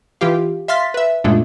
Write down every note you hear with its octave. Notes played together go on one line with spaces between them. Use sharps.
E3 F4 G4 F5
E5 F5 C6 F6 A6 B6
B4 E5
F#2 A#2 G#3 A3 D4